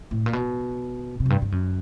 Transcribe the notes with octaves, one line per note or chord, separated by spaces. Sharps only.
A2
A#2
B2
C3
F#2
G2
G2
F#2